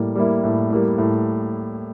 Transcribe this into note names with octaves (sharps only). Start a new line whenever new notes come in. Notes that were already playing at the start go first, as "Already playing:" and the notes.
Already playing: A2 G3 A#3 E4
G3 A#3 E4
A2
G3 A#3 E4
A2